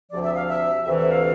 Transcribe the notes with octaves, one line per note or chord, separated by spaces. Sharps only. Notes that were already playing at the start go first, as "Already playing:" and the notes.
D2 C3 F3 D5
E5
F5
E5
D2 C3 E3 E5
E5
F5